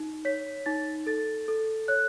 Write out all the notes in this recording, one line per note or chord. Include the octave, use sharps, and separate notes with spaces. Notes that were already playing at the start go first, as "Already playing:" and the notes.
Already playing: D#4
C#5 B6
D#4 A6
A4 A6
A4
C#5 F#6